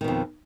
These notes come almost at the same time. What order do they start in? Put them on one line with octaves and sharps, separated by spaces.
D#3 B2 F2